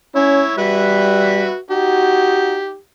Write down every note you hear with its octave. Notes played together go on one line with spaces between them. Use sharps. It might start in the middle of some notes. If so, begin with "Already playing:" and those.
C#4 E4 C#5
G3 F#4 B4 E5
D#4 F#4 G4